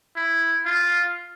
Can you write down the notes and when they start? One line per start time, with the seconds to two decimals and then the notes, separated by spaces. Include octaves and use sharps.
0.16 E4
0.65 F4